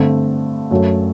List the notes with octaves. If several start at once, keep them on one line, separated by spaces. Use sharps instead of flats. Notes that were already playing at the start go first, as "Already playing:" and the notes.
Already playing: G2 D3 A3 C4
F#2 F#3 A3